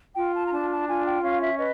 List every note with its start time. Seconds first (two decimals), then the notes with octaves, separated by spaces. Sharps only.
0.15 F4 G5
0.33 A5
0.46 A#5
0.51 D4 A5
0.69 A5
0.86 F4 G#5
1.04 G5
1.22 C#4 F5
1.40 E5
1.57 B4 D#5